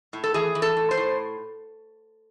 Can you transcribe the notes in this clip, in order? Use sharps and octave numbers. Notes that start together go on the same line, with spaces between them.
A2
A4
E3 G#4
E3
A4
A2
C5
A2